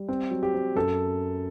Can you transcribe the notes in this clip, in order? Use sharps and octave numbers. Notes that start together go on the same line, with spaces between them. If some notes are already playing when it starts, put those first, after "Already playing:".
Already playing: G3
C4
F#3
G4
C4
F#2 A4